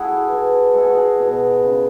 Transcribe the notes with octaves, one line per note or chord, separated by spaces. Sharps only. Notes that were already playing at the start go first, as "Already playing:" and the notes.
Already playing: A3 E4 F#4 G#4
E3
G#3 A4
G#4
F#4
G#4
B2
C#3